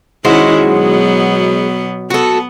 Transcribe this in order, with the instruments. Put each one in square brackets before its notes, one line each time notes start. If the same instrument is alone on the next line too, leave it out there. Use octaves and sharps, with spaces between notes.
[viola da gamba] D#3 C#4 E4 [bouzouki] G#3 F#4 C5
[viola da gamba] B2 F#3 B3
[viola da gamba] B3 [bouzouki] F#4 A4